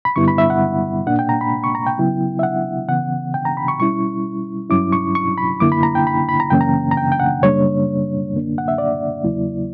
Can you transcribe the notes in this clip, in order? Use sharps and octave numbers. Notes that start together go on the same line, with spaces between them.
B5
G2 D3 G3 B3 E4 C#6
B5
E5
F#5
A#2 A#3 D4 F#5
G5
A#5
B5
C#6
A#5
G5
C#3 F#3 B3 E4
E5
F#5
C#3 E3 B3 F#5
G5
A#5
B5
C#6
B2 G3 C#4 E4 C#6
G2 F#3 C#4 E4 D6
C#6
C#6
B5
F#2 D3 A#3 E4 D6
B5
A#5
G5
B5
B5
A#5
F#2 C#3 E3 A#3 C#4 G5
A#5
A#5
G5
G5
F#5
F#2 C#3 G3 A#3 D4 C#5
F#2 D3 A#3 D4
F#5
E5
D5
E2 C#3 F#3 A#3 E4